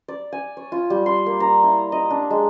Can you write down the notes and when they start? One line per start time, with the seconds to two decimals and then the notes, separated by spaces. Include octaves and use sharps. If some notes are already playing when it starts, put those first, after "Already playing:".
0.08 D5
0.32 G#5
0.57 C#5
0.72 F4
0.90 G3
1.06 C6
1.26 A#3
1.40 A#5
1.64 E4
1.92 D#5
2.10 D4
2.30 G#3